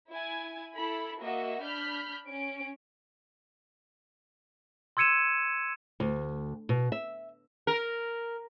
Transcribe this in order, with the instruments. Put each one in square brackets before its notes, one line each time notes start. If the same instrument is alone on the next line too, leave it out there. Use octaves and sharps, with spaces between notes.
[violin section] E4 G#5 G#6
E4 A4 B5
A#3 F#4 D#5 E5
D4 B5 F6 G6 B6
C#4 D7
[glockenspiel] C6 E6 G#6 C#7 D#7 E7
[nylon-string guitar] D2
B2
E5
[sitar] A#4